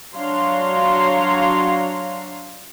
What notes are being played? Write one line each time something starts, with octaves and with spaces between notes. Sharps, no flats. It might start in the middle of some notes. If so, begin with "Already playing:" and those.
F#3 D4 C#5 F5 A#5 C6